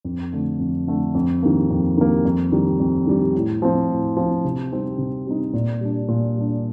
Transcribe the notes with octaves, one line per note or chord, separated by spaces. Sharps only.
F2
D3 A3
F2
D3 A3
F2
D#3 G3 A#3
F2
D#3 G3 A#3
F2
D#3 G3
F2
D#3 G3
A2
F3 C4
A2
F3 C4
C3
G3 C4 D#4
C3
G3 C4 D#4
A#2
G3 D4
A#2
G3 D4